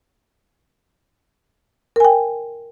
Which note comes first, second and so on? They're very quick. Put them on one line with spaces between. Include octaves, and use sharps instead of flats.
A#4 G#5 G5